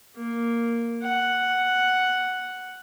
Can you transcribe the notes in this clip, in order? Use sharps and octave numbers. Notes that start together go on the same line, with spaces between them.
A#3
F#5